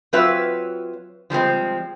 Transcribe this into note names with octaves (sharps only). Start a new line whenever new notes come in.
F#3 C4 F4 B4 C#5 E5
F3 G3 G#3 C4